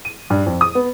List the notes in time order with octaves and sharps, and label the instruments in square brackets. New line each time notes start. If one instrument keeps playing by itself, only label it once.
[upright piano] D#7
G2
F2
D#6
B3